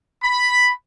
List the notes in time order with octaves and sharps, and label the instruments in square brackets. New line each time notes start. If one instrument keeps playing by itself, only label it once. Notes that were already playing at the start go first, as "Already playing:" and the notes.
[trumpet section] B5